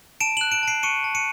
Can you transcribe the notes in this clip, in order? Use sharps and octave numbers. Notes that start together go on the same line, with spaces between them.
A5 D7 E7
F#6 E7 F#7
D7 E7
A5 C7 D7
C#6 C#7 D#7
A5
C#7 D#7